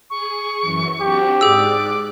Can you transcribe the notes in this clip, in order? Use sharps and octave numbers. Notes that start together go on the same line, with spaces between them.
G#4 C#6
F#2 E3
C4 D4 F#4 G4
G#2 G#4 D5 D6 E6 F#6